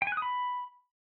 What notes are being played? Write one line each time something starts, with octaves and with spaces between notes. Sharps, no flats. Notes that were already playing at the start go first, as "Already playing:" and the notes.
G5
G#5
F#6
D#6
B5